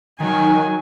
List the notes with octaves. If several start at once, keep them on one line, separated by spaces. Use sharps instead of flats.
D#3 F#3 G#5